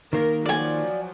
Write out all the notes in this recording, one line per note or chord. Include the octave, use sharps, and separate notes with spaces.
D#3 A#3 A#4
F3 F#3 D5 G#5